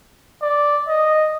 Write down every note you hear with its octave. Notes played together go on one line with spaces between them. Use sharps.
D5
D#5